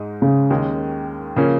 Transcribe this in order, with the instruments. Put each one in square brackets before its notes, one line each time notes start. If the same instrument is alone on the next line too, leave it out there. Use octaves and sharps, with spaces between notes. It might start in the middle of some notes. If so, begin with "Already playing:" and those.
Already playing: [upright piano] G#2 G#3 D#4
[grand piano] C#3
[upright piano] D#2 D#3 G#3 C#4
C#3 F3 A#3 C#4